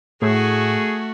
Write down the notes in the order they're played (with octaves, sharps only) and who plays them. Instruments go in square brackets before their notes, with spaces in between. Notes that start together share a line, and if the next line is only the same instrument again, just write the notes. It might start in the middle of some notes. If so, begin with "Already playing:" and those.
[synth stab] A2 [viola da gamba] A3 F#4 [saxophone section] G#4